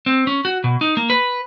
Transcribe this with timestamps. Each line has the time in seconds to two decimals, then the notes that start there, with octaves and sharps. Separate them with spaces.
0.06 C4
0.27 C#4
0.45 F#4
0.64 B2
0.81 D#4
0.97 A#3
1.10 B4